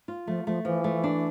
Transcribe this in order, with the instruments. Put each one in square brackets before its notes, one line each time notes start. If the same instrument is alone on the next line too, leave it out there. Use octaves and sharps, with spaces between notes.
[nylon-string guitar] F4
[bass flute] F3 [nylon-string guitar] A3
[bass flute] F3 [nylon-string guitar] A3
[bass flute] E3 [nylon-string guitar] F3
[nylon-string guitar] A3
D4